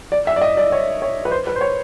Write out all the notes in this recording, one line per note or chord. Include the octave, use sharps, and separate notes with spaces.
D5
E5
D5
D#5
D5
C#5
C#5
B4
C5
B4
C5
C#5